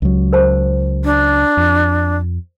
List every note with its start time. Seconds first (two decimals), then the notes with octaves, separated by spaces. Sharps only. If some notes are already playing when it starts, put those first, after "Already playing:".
0.02 C#2 F#3
0.33 A#4 C5 A5
1.04 D4
1.57 F2